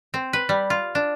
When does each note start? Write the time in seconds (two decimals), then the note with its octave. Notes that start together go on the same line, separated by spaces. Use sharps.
0.14 C4
0.33 B4
0.49 G3
0.70 F4
0.95 D4